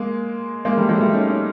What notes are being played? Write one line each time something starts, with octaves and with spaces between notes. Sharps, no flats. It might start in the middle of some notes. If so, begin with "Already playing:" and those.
Already playing: G#3 A#3
G#3 A#3
G3 A3
F#3 G#3
G3 A3
C#4 D#4
C#4 D#4